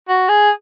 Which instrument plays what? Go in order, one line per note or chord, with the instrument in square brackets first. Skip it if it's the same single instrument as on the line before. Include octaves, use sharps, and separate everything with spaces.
[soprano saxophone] F#4
G#4